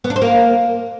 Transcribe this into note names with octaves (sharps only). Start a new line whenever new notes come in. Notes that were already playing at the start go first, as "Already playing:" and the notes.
B3
D4
C5
A#3